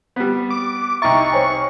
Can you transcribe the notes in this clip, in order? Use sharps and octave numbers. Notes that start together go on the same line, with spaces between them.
G3 B3
D6
C2 D#4 E5 A#5 C#6 D6 A6
C5 C#5 G#5